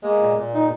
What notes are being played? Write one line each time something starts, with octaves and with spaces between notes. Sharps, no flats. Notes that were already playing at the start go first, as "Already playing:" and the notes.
G#3 A#3
A#2
A#2
D#4